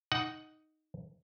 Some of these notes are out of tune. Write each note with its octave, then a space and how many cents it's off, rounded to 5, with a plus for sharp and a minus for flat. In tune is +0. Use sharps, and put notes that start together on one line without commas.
D#4 +0 F#5 +10